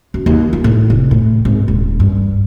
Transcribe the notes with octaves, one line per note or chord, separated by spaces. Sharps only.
F#2
D#2
F4
A2
F1
A2
G#1
D#1
G2